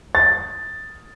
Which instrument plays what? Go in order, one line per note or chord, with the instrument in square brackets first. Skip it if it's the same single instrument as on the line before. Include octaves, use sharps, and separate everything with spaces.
[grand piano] A6